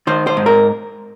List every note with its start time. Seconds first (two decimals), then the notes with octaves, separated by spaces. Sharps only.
0.07 D#3 C5
0.27 C5
0.37 G#2
0.46 A#4